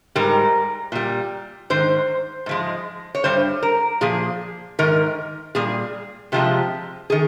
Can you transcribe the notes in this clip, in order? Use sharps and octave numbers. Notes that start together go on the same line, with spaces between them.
G#2 G3 A#4
A#2 G3
G#2 D#3 C5
G#2 F3 G#3
C#5
G2 G3 C5
A#4
A#2 F3 G#4
G#2 D#3 A#4
A#2 G3 G#4
C3 F3 G#3 G4
D#3 G#4